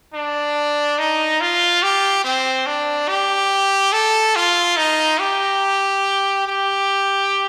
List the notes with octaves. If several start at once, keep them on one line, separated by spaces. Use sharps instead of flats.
D4
D#4
F4
G4
C4
D4
G4
A4
F4
D#4
G4
G4